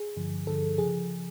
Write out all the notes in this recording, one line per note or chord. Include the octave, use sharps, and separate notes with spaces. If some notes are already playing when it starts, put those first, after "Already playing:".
Already playing: G#4
G2 D3 F3
G2 D3 F3 A4
C#3 F3 G#4